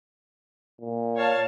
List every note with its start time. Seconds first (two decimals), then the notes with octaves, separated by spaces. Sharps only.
0.80 A#2
1.16 C#5 F5 A5